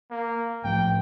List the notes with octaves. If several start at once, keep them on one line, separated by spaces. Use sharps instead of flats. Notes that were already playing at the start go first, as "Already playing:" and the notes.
A#3
A2 F3 G5